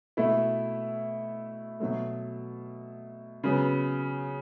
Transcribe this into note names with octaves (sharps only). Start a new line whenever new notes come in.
B2 A3 E4
B2 F#3 A3
C#3 F#3 B3